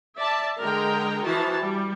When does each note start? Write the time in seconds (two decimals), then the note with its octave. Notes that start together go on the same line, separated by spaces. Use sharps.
0.17 D5 E5 A5
0.60 D3 G#3 A#4 D#5 G5 A#5
1.23 E3 F3 F#4 A5
1.61 G3